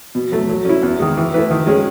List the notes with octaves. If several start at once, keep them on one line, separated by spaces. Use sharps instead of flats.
B2
F#3 A3
F#3
C#4 E4
E2
D#3 G#3
E3
A3 E4 B4
D#3
G#3 C#4 G#4